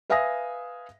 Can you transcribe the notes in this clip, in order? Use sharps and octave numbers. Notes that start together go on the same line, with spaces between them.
B4 E5 F5 G#5 D#6 A#6